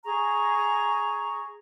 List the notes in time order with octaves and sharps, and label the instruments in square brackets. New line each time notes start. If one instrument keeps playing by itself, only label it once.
[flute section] G#4 A#5 C#6